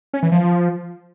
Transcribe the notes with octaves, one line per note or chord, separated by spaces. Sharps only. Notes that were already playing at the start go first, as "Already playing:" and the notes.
C#4
E3
F3